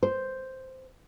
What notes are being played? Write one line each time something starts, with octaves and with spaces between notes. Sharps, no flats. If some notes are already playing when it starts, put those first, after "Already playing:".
C5